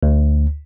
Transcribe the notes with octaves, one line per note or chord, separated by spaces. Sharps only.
D2